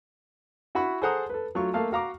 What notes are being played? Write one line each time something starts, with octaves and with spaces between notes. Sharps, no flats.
E4 F#4 F#5 B5 C#6
G#4 A4 C5 F#5 A#5 D#6
A4 B4
F#3 A3 F4 C#6
A3 A#3 F5 A5
F#4 F5 A#5 C#6 D6